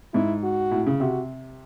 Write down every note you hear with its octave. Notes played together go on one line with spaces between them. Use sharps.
G#2 E4
F#4
A2
C#3
C3 F#4